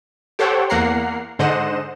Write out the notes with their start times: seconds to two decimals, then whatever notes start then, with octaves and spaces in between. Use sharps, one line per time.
0.39 G4 A4 C5 C#5 F#5 G5
0.70 E2 A#3 A#4 F#5 A#5 C7
1.39 G#2 D3 C5 D#5 F#5 E7